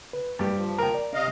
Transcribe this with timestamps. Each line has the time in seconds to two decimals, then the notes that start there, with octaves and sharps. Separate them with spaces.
0.13 B4
0.39 G2 G4
0.55 F3
0.78 A#4 G5 A#5
0.95 D5
1.13 C3 D#5 F5